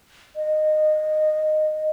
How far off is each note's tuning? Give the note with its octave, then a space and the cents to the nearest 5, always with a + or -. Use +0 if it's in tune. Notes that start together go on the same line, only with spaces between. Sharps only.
D#5 -15